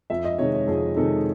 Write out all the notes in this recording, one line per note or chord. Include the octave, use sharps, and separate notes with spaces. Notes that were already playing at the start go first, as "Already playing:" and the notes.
F2 E5
D#5
C3 D#3 G#3 C#5
C#5
F2 G#4
C3 D#3 G#3 A4